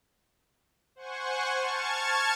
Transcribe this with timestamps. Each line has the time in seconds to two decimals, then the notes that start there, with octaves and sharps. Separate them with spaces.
0.96 C5 F#5 G#5 C#6
1.55 A5 C#6 F6 G#6 A6